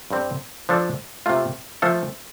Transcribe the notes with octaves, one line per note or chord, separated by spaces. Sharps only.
G2 G3 C4 A4
F3 D4 A4
C3 A3 F4
F3 A3 F4 A4